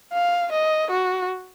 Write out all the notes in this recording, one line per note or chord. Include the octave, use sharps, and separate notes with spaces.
F5
D#5
F#4